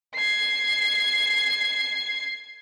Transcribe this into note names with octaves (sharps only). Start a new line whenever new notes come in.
G#6 C7